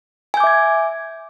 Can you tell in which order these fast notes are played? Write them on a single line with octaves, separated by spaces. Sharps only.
G#5 G6 D6 E5 G#6